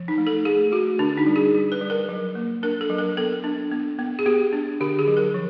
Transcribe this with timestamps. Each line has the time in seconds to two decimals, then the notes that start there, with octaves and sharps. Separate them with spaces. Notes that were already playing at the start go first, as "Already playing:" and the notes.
Already playing: F3
0.08 D#4
0.18 A3
0.27 A4
0.45 A3 G#4
0.72 A3 F#4
0.99 D3 D4
1.18 D#4
1.26 G3
1.36 G#4
1.54 G3
1.72 B4
1.81 G3
1.90 A#4
2.09 F#3
2.35 A#3
2.63 D4 A#4
2.81 A4
2.90 F#3
2.98 A#4
3.17 B3 A4
3.44 D4
3.72 B3
3.99 B3
4.19 G#4
4.26 B3 G4
4.53 D4
4.81 D3 G4
4.99 G#4
5.08 F#3
5.17 A#4
5.34 F3